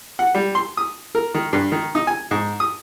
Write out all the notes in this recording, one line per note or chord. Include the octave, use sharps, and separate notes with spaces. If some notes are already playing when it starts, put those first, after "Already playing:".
F#5
G3
C6
D#6
A#4
D#3
G2
D#3
D#4
G#5
G#2
D#6